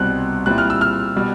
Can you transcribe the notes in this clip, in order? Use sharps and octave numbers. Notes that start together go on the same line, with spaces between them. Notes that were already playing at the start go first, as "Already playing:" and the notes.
Already playing: C2 B2 G3 C4 F#6
A#2 G3 C4 E4 F#6
F6
E6
F6
B2 G3